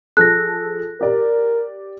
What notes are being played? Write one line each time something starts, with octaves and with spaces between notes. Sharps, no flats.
F3 G#4 A4 F#6 A#6
G4 A#4 D5